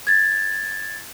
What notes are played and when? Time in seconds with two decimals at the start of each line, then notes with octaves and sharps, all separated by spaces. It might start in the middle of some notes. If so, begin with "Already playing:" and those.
0.07 G#6 A6